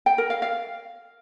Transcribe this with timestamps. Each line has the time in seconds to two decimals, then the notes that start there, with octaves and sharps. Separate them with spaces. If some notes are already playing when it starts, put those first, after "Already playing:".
0.06 G5
0.18 A#4
0.30 F5
0.42 F5